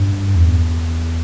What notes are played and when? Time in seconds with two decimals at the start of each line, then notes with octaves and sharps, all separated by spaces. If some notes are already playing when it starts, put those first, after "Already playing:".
Already playing: G2
0.36 E2